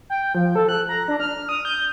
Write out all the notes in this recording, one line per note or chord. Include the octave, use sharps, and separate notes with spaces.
G5
F3
A4
F#6
A#5
D4
F6
D#6
G6